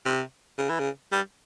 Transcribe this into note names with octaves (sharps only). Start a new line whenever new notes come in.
C3
C#3
E3
C#3
G3